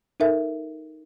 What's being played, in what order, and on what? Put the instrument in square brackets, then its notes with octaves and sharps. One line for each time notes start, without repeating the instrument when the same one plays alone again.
[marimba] D#4 A4 A#4 E5